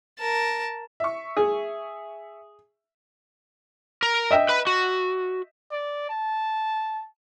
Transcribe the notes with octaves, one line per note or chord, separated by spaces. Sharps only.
A#4 A5
E5 C#6
G#4
A#4
D#5 E5 G5
B4 B5
F#4
D5
A5